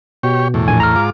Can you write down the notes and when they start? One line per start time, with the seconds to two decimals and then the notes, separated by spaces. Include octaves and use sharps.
0.23 B2 G4 C#5
0.54 E2 A2
0.67 A#1 G#5
0.80 A#5 F6
0.96 G#2 F4 D6